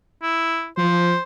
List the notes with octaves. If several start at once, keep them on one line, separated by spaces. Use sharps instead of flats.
E4
F3 C5